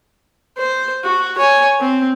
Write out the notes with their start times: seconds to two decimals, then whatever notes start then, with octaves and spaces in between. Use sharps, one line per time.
0.57 C5
1.04 F#4
1.38 C#5 G#5
1.80 C4